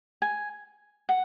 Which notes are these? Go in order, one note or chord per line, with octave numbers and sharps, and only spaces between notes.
G#5
F#5